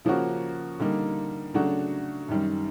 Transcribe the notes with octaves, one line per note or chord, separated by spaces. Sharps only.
C#3 F3 A#3 C#4 F#4
D3 G3 A#3 D#4
C#3 F#3 A3 D4 F#4
F#2 D#3 G3